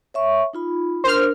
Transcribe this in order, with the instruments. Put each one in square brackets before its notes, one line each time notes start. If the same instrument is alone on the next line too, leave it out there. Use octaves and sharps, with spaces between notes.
[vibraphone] C#5 E5 C#6
D#4 F4 B5
[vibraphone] D4 A#4 [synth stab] C5 F6